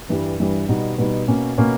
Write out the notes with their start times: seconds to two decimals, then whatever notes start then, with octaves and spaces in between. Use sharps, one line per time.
0.09 G2 E3 G3
0.39 G2 E3 G3
0.69 B2 G3 B3 D#4
0.98 B2 G3 B3 D#4
1.28 B2 A#3 C#4
1.58 B2 A#3 C#4